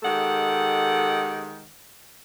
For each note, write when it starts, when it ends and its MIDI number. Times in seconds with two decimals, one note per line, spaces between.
0.03 1.65 51
0.03 1.65 56
0.03 1.65 67
0.03 1.65 69
0.03 1.65 78